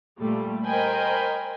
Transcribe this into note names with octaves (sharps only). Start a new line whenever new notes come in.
A#2 G3 A3
A#4 C5 D#5 G5 G#5 B5